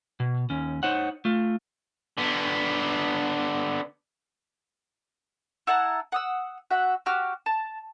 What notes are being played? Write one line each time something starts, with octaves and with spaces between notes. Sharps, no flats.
B2
D#2 C#4
D#4 C5 C#5 F#5
A3 F4
D3 B3
E4 F#5 A5 A#5
F#5 D#6 E6
F#4 E5 F#5
F#4 G4 F6
A5